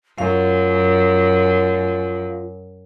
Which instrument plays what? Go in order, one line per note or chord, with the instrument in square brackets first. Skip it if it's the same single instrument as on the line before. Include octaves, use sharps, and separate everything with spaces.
[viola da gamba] F#2 [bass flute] F4 [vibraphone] F5